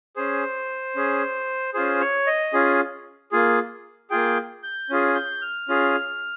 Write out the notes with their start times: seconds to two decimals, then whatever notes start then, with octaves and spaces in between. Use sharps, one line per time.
0.16 C#4 G#4 C5
0.96 C#4 G#4
1.74 C#4 F4 G#4 C5
2.01 C#5
2.27 D#5
2.53 C#4 F4 G#4
3.32 A#3 F4 G#4
4.10 A#3 F4 G#4 G5
4.63 G6
4.90 C#4 F4 G#4
5.15 G6
5.42 F6
5.68 C#4 F4 G#4